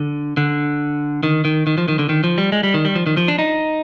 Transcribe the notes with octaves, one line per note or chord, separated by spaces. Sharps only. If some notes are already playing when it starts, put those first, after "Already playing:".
Already playing: D3
D3
D#3
D#3
D#3
F3
D#3
D3
D#3
F3
G3
G#3
G3
D#3
G3
F3
D#3
F3
D4
D#4